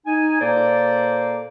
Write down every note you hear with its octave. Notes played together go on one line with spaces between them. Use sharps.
D#4 G#5
A#2 A#3 A4 C5 D5